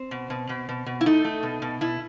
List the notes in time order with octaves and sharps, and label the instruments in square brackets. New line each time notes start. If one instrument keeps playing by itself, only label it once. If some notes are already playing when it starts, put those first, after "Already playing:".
Already playing: [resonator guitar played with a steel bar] C4
B2
B2
B2
B2
B2
E4
A3 D#4
A3
B2
B2
B2 E4